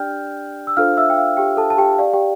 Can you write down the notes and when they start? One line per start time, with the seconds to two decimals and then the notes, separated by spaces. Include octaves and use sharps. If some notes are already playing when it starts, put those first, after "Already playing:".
Already playing: D4 G4 D5 G5 F6 G6
0.67 E6
0.77 D4 F4 A4 C5 F5 F6
0.97 E5 E6
1.10 G5
1.17 F5
1.37 G4 G5
1.57 A4 A5
1.70 A5
1.78 G4 G5
1.98 G4 D5 F5
2.13 G4 G5